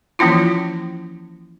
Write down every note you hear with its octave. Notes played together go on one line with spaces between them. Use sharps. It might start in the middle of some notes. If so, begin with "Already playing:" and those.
E3 F3 A#3 C#4 E4 F4